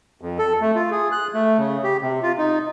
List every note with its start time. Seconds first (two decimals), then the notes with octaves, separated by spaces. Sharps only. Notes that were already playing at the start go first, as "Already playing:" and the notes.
0.21 F2
0.38 A4
0.61 A3
0.75 F4
0.91 G#4
1.12 F#6
1.34 A3
1.58 C#3
1.83 G4
2.02 C3
2.23 F4
2.38 D#4